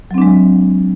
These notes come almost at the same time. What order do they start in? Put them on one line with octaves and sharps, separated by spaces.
F#3 C4 D4 G#3